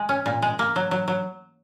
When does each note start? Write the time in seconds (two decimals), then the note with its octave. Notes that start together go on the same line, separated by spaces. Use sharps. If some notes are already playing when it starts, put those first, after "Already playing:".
Already playing: G#3
0.09 C#4
0.26 A#2
0.42 G#3
0.59 A#3
0.76 F#3
0.91 F#3
1.08 F#3